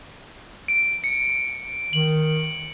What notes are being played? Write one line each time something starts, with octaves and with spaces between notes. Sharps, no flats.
D7
C#7
D#3 F#7